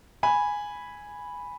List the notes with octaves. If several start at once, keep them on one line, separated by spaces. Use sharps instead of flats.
G#5 B5